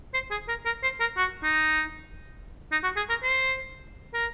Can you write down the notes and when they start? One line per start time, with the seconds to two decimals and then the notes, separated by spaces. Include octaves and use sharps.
0.14 C5
0.31 G#4
0.48 A#4
0.65 A#4
0.83 C5
1.00 A#4
1.17 F#4
1.43 D#4
2.72 D#4
2.83 F#4
2.97 G#4
3.09 A#4
3.23 C5
4.14 A#4